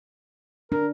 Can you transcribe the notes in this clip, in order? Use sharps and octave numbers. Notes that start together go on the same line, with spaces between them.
D4 A#4